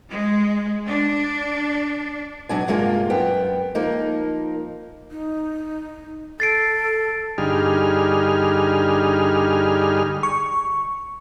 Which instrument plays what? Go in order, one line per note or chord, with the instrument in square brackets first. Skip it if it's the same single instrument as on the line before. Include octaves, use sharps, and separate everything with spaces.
[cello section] G#3
D4
[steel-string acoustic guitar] B2 F#3 D4 G#5
G2 C3 G#3 A#3 F4
F#2 B3 G5
F3 A#3 D#4
[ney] D#4
[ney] A4 [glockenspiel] A6 C7 D7
[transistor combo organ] G2 D3 G3 D#4 G#4 F6
[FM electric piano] C#6